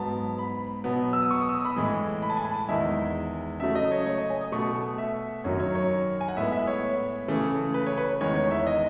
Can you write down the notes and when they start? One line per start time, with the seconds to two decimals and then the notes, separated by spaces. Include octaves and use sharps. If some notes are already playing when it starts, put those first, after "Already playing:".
Already playing: G#2 F#3 B3 A5
0.38 B5
0.84 B2 F#3 B3
1.13 E6
1.22 D#6
1.31 C#6
1.42 D#6
1.49 E6
1.54 D#6
1.65 B5
1.76 A2 E3 G#3
2.22 B5
2.30 A5
2.37 G#5
2.45 A5
2.69 E2 D#3 G#3 E5
3.60 C#3 F#3 A3 E5
3.75 D#5
3.91 C#5
4.06 C#5
4.18 D#5
4.30 G#5
4.41 D#6
4.52 B2 A3 C#6
4.98 E5
5.44 F#2 D#3 F#3 C#5
5.60 C#5
5.75 C#5
6.21 G#5
6.28 F#5
6.37 A2 G#3 B3 E5
6.52 E5
6.67 C#5
7.28 C#3 E3 A3
7.74 B4
7.86 C#5
7.97 B4
8.21 E2 D#3 G#3 C#5
8.36 C#5
8.51 E5
8.67 D#5